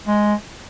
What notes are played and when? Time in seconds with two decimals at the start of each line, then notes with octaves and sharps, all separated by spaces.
0.07 G#3